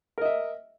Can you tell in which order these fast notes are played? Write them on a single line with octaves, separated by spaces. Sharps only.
A#4 D#5 E5